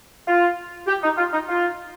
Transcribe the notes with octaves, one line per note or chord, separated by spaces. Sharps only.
F4
G4
D#4
F4
D#4
F4